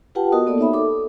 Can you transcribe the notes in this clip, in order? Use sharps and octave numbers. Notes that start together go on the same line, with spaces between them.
F4 G4 B4 F#5 G5 A5
B3 F#4 A#4 D#5 D#6
A#3 B3 A4 D5
D#4 C#5 E5 B5
A4 D6